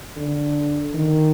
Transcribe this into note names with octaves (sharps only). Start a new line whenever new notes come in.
D3
D#3